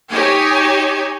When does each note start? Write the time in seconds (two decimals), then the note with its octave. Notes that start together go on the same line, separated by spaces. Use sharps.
0.11 D#4 G4 C#5 G#5